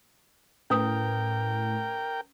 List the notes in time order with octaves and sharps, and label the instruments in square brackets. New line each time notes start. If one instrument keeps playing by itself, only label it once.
[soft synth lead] A2 [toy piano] C#4 B4 D#6 [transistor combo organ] A#4 G5